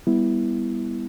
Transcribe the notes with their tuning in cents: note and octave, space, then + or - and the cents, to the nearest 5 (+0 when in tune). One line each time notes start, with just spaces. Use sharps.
G3 +35 B3 +0 E4 +0